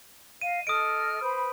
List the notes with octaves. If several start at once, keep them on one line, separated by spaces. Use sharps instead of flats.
D#5 F5 D#7
A4 D#5 D#6 F6 D7
B4 C5 B5